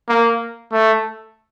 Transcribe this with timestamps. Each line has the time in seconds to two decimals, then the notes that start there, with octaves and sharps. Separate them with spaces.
0.08 A#3
0.72 A3